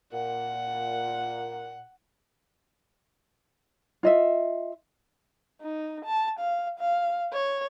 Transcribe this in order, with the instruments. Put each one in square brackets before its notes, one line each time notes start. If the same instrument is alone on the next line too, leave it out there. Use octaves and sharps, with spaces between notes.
[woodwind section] A#2 [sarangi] F#5
[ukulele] F4 D#5 E5
[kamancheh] D#4
A5
F5
F5
C#5